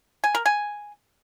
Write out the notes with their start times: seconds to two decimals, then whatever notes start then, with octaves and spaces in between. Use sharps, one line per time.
0.24 G#5
0.35 A#4
0.46 G#5